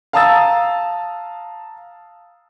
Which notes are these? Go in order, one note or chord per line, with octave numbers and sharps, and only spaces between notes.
F5 A5 A#5 D#6 E6 A6